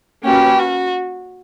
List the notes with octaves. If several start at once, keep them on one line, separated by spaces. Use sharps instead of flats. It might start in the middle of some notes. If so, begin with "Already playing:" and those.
A#3 C#4 F#4 G4 B4
F#4